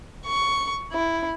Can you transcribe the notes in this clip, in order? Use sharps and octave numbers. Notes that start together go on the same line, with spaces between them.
C#6
E4